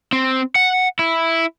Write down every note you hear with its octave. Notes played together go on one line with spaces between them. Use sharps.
C4
F#5
E4